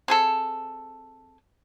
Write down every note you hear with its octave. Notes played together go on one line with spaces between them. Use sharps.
C4 G#4 A4